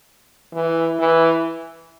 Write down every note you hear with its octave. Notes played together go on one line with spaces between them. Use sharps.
E3
E3